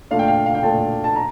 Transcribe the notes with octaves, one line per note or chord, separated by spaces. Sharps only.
A#2 A3 D4 F5
G5
F5
F5
G5
A#2 A3 D4 A5
A5
A#5